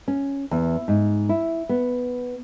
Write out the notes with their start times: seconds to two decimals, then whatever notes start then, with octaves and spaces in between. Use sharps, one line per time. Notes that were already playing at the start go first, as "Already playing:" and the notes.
0.08 C#4
0.51 E2
0.88 G#2
1.29 E4
1.69 B3